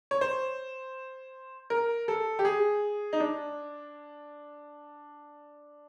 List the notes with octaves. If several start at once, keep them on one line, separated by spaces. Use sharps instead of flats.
C#5
C5
A#4
A4
G4
G#4
D#4
D4